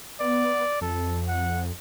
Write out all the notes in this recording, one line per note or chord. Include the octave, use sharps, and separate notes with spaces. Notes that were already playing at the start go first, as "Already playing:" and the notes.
B3 D5
F2 A4
F#5